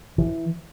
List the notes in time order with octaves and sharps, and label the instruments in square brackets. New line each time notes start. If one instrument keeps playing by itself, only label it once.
[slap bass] E3